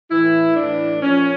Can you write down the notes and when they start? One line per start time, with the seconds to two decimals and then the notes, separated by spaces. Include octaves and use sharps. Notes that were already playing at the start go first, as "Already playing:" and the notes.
0.11 A2 E3 E4
0.56 A2 E3 D4
1.01 A#2 F3 C#4